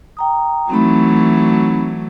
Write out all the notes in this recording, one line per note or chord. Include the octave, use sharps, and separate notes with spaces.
G5 A#5 D#6
E3 F#3 A3 C4 D#4 B5